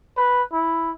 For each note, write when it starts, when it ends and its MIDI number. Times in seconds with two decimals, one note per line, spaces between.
0.17 0.42 71
0.53 0.91 64